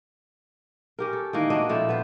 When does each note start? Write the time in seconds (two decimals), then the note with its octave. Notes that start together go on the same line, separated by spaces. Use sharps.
0.99 C#4 G4 A#4
1.13 A4
1.33 D#3 E3 A#3 D#4
1.50 C4 D4 F#4 D#5
1.69 A#2 F3 E4 A4
1.89 B3 B4 C5